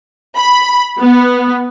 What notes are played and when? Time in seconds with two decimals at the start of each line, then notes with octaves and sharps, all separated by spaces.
0.37 B5
1.02 B3